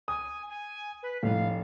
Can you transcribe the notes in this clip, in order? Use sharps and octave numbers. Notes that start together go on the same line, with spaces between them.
G#5 D#6
G#5
B4
F1 A2 F5